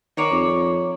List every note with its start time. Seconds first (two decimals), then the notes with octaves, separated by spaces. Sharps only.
0.17 D#3 A#3 C#5 D5
0.32 F2